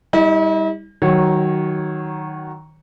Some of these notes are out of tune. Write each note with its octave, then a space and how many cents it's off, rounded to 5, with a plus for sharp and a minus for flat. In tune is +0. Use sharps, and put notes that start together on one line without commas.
G3 +20 E4 -45 D#5 +0
D#3 +0 F#3 +15 C#5 -15